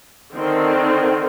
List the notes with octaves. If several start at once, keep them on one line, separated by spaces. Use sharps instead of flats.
D3 D#3 C4